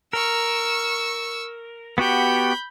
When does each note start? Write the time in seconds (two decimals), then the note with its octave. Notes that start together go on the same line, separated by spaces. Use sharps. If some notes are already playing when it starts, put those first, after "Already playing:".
0.13 A#4 C#6 E6
1.98 B3 F#4 G4 B5 G6